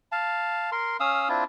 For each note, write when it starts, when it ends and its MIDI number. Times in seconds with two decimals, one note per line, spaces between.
0.12 0.70 77
0.12 0.70 81
0.72 0.97 70
0.72 0.97 84
1.00 1.29 61
1.00 1.29 77
1.00 1.29 87
1.00 1.29 88
1.29 1.44 60
1.29 1.44 62
1.29 1.44 64
1.29 1.44 65